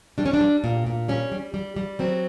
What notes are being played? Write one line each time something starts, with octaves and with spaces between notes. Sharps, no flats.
G3 D4
C#4
D4
G3
A#2
A#2
G3 C#4
G3
G3
G3
F#3 C4